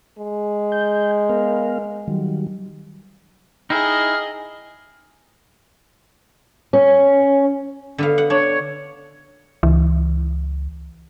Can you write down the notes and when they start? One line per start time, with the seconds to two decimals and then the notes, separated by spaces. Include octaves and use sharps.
0.19 G#3
0.72 G6
1.29 B3 A#4 F5
2.08 D#3 F#3 G3
3.70 D#4 E4 G#4 D#5 G5 G#5 F6
6.73 C#4
7.98 D3 B3 F5
8.18 F#5
8.30 D4 C#5
9.63 C#2 E3